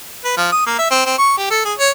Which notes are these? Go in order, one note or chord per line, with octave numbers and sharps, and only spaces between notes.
B4
F3
D#6
A#3
E5
C4
C4
C#6
G4
A4
G#4
C#5